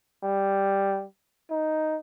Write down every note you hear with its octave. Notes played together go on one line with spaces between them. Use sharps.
G3
D#4